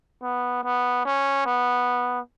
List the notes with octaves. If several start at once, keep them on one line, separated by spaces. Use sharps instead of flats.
B3
B3
C#4
B3